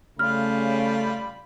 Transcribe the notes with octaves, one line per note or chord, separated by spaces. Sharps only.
C#3 G3 A3 F4 B5 F6